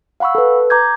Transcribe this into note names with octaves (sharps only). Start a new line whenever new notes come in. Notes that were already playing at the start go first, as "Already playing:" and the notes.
F5 F#5 B5 C#6 E6
A4 B4
A#5 D6 G6 G#6